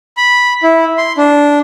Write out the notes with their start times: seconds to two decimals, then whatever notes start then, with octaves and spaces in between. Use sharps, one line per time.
0.17 B5
0.63 E4
0.98 C6
1.18 D4